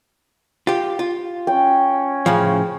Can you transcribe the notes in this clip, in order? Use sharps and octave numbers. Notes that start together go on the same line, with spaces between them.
F4 G4
F4
C#4 G5
A2 C#3 F3